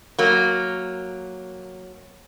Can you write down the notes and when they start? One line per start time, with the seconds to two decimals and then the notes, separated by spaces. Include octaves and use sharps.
0.19 F#3 A#3